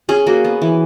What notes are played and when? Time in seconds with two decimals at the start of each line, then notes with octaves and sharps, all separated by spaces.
0.09 C#4 G#4
0.26 A#3 F#4
0.45 B3
0.62 E3